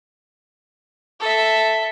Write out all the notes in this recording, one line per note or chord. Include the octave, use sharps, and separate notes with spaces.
A4 E5